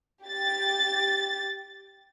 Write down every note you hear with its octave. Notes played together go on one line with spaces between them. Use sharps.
G4 A6